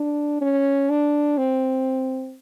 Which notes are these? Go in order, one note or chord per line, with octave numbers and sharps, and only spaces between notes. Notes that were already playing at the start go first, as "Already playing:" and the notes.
Already playing: D4
C#4
D4
C4